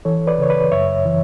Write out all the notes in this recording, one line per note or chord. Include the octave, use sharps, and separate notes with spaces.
E3 A4 C#5
B4 D5
C#3 C#5
B4 D5
F#2 C#5 E5
E3